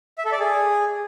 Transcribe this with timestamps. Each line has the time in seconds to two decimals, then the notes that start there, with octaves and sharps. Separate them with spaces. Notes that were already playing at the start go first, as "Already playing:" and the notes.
0.18 E5
0.25 A4
0.32 D5
0.39 G#4